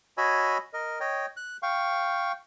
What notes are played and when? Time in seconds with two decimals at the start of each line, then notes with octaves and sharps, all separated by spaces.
0.18 F#4 C#5 D#5 G#5 B5 E6
0.73 A#4 D#5
1.00 C#5 D#5 G5
1.37 F#6
1.63 F5 G5 C#6